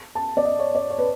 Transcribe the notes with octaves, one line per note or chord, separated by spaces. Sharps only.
A5
D5
D#5
C#5
D5
C#5
B4